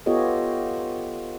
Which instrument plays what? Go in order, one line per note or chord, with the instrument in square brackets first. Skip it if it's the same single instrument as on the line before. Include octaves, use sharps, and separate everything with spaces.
[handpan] B3 F4 G4 A4 C#5 D#5